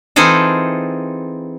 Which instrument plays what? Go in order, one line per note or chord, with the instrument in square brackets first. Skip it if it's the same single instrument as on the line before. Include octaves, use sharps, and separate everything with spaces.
[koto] E3 C4 D#4 F4 G#4 A4